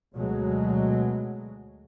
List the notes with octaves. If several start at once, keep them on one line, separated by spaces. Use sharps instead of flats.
D2 B2 F#3 G#3